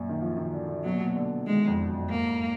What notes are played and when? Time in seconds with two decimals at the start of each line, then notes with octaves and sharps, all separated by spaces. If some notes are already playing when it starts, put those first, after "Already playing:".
Already playing: F#2 A#2
0.09 D#3
0.22 F3
0.37 D#3
0.53 D3
0.68 D3
0.84 B2 F#3
0.92 A#2
0.99 B2
1.16 D3
1.47 D#3 G#3
1.67 F2
1.89 F#2
2.09 G#2 A#3